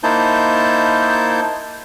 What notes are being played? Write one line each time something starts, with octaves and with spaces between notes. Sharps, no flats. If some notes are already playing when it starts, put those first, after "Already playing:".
A#3 D#4 E4 C5 A5 G6